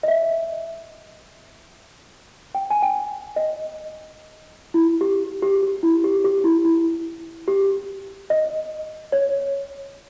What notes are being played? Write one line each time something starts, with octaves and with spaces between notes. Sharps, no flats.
D#5
E5
G5
G#5
G5
D#5
E4
G4
G4
G4
E4
G4
G4
E4
E4
G4
D#5
C#5